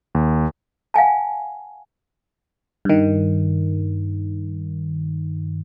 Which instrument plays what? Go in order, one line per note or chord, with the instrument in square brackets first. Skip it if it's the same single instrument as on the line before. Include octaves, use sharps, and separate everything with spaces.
[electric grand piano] D#2
[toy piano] F5 F#5 G#5 A5
[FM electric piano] G2 D#3